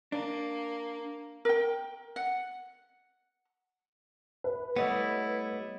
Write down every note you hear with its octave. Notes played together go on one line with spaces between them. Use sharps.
A#3 D4
A#4 G5
F#5
B4
G3 A3 B3 E4 C#5 D#5 F#5